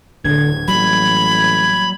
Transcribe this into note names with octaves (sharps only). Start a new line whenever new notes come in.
D1 E2 D3 G#6
A1 F#3 G3 A#3 B5